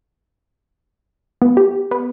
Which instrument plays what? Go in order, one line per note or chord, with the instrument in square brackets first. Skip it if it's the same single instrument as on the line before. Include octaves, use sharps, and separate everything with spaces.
[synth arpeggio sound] B3
G4
B3